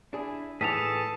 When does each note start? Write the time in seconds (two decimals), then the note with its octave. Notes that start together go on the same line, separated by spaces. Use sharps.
0.13 D4 E4 G#4
0.61 A2 E3 E4 G#4 A4 A5 B6 F7